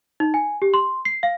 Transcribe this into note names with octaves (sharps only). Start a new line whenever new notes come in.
D#4
G#5
G4
C6
C7
F5